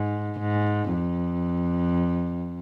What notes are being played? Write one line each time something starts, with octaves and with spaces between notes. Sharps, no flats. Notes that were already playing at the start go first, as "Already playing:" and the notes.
Already playing: G#2
G#2
F2